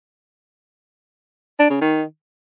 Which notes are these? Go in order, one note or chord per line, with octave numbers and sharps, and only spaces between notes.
D4
C#3
D#3